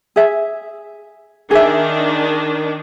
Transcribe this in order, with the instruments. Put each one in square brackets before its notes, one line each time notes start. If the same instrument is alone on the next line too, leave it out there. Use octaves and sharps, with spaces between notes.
[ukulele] G#4 E5
[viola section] D#3 D4 [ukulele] G#4 E5